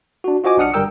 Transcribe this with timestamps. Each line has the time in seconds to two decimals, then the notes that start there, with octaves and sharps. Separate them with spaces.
0.24 D4 F#4
0.44 F4 F#4 C5 D#5 G#5 D6
0.57 B1 D4 F#5 D#6 F6 C#7
0.74 G1 G3 A#4 G5 E6